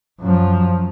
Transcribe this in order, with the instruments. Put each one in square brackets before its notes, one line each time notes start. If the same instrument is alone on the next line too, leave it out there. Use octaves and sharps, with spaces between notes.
[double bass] F#2 F3